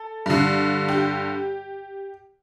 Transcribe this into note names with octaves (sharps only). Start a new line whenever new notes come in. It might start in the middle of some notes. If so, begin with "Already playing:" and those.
Already playing: A4
G2 D3
G4